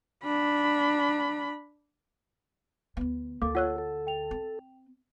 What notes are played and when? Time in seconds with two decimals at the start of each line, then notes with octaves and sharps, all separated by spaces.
0.24 D4 B5
2.97 D2 B3
3.42 D2 A#3 A4 D6
3.55 F4 C#5 F#5 E6 F#6
3.78 A4
4.07 G5 F7
4.31 C4